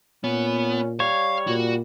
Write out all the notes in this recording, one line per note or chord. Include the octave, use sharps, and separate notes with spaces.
A#2 B3 C#4
G3 C#5 F5
A#2 F#4